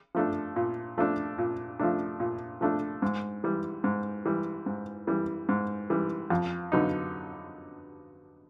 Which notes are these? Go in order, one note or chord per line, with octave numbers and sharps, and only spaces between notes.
F3 A3 D4
A#2
F3 A3 D4
A#2
F3 A3 D4
A#2
F3 A3 D4
G#2
E3 G3
G#2
E3 G3
G#2
E3 G3
G#2
E3 G3
F2
D3 F#3 B3 D#4